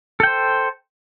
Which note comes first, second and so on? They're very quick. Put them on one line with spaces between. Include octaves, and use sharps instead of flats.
A4 G5 C5